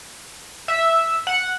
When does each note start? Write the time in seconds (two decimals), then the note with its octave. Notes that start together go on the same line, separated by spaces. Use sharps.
0.68 E5
1.27 F#5